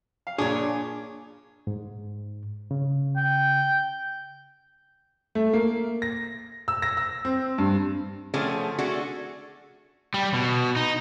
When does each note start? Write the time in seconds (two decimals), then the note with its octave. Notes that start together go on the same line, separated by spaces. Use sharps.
0.27 F5
0.38 A#1 A#2 D4 G#4 C#5 C#6
1.67 G#2
2.71 C#3
3.16 G5
5.35 A3
5.53 A#3
6.02 A#6
6.68 E6
6.82 A#6
6.97 E6
7.25 C4
7.58 G2
8.34 D3 F3 A3 C4 C#4 G#4
8.78 A3 D4 F#4 G#4 A4
10.14 G3
10.34 B2
10.76 D#4